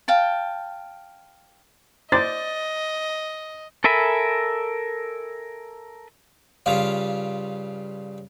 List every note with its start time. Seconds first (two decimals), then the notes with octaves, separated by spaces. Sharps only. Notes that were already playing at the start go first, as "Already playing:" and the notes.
0.08 F5 G5 A5
2.12 C5 D5 D#5 A6
3.84 A4 A#4 E5 G#5 B5
6.66 G2 C#3 F4 F5